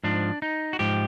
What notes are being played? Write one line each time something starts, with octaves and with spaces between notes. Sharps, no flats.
G#2 F3 D4
D#4
F#4
G#2 F3 G4